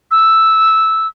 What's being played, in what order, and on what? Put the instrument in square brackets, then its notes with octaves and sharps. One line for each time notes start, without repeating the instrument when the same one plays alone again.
[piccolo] E6